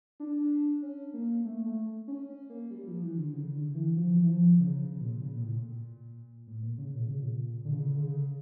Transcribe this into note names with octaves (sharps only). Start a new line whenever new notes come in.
D4
C#4
A#3
A3
A3
C#4
C#4
A#3
G3
F3
E3
D3
C#3
D3
E3
F3
E3
F3
C#3
C#3
C#3
A#2
C#3
A#2
A2
A#2
A2
A#2
C#3
A#2
C#3
A#2
D3
C#3
D3
C#3